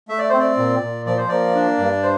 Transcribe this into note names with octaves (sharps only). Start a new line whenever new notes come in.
A3 E5
D5
C4 C5
D5
A#2
A#2
F3 D5
C5
A#3 D5
D4
G2
C5